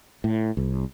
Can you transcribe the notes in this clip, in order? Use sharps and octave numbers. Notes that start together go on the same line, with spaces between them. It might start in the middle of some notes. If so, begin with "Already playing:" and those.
A2
C2